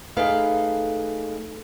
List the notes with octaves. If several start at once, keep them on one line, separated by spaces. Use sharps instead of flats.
A3 D#4 G#4 A4 B4 F5